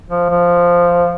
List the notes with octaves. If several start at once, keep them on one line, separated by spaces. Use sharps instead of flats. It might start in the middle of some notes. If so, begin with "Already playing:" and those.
F3
F3